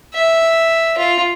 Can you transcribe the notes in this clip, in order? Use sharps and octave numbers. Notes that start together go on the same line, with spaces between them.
E5
F4